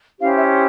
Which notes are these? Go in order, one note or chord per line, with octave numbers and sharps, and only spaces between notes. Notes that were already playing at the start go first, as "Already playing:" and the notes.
C#4 E4 G4 C5 F5
E5